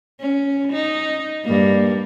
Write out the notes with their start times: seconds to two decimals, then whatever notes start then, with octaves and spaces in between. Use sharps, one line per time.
0.20 C#4
0.72 D#4
1.44 G2 A#3